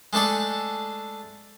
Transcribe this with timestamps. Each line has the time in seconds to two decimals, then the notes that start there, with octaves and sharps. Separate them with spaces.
0.13 G#3 A3 D4 G#4 A4